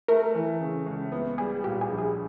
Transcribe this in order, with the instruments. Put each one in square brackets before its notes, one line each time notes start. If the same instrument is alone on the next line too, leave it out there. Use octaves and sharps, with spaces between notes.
[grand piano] A3 [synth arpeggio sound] A#4
[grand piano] E3
C#3
C#2
B3
[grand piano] G3 [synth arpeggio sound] G#4
[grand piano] A#2 [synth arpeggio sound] G4
[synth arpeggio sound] G#4
[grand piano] A#1
[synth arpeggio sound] G#4